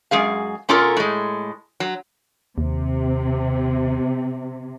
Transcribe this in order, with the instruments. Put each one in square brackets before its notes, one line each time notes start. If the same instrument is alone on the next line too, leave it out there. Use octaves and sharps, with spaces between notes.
[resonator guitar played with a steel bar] F#2 G#3 G#4 F5
B2 C#4 F4 A4 A#4
A2 G#3
F#3
[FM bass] D#2 [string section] C3